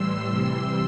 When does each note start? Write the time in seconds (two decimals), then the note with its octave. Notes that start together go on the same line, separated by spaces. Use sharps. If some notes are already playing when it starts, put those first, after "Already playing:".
Already playing: A2 E3 G3 C6 E6
0.28 C3 E3 G3